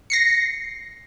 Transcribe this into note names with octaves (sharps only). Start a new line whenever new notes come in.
A#6 C7 C#7